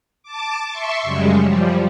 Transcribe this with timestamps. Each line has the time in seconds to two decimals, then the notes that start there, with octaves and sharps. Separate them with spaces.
0.23 A5 D6
0.69 E5 C6 C#6
1.03 F#2 C#3 G3 G#3
1.45 F3 G3